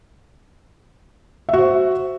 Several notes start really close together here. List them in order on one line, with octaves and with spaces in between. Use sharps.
E5 F#4 C5